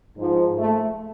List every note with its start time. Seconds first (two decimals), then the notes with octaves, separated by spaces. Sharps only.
0.17 G#2 F3
0.59 A3